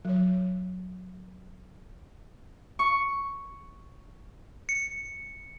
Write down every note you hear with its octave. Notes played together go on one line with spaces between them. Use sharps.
F#3 C#5
C#6
C#7